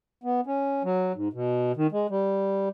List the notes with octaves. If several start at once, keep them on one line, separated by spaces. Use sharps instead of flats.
B3
C#4
F#3
G#2
B2
D#3
G#3
G3